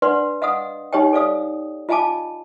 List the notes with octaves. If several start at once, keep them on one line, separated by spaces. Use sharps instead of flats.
D4 B4 D5 F#5 C6
D#5 F5 F#5 D#6
D#4 G4 C#5 D#5 G5
A4 D5 F5 D#6
F4 D#5 F5 G#5 A5 D6